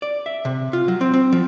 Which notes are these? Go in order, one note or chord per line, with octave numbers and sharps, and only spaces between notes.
D5
E5
C3
F4
F#3
C4
C4
F3